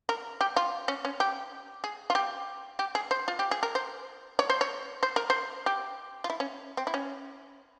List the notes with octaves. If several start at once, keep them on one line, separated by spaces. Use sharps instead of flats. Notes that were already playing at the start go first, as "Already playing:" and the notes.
A#4
G4
F4
C#4
C#4
G4
G#4
F4
G4
G4
G#4
C5
F4
G4
G#4
A#4
C5
C#5
C5
C#5
C5
A#4
C5
G4
F4
E4
C#4
C4
E4
C#4